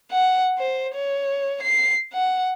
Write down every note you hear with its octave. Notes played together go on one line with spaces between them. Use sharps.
F#5
C5
C#5
C7
F#5